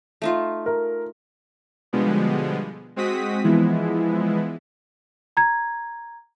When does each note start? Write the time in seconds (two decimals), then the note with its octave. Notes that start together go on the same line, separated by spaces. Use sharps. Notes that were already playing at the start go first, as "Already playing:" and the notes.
0.22 A3 D#4 F4
0.66 A#4
1.93 B2 D3 F3 G3 G#3 B3
2.96 G#3 C4 F#4 D#6 B6
3.44 E3 F3 G#3 B3 E4
5.37 A#5 G#6